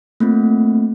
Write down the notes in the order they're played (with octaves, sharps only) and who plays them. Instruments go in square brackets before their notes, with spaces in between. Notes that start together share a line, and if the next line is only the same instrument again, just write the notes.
[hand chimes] A3 A#3 C4 F4